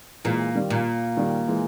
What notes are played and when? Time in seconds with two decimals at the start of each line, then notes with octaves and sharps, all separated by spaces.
0.24 A#2 E3 G#3
0.55 D#3 G3
0.70 A#2
1.17 D#3 G3
1.48 E3 G#3